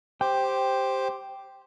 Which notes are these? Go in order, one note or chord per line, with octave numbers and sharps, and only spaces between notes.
G4 C5 G5 D6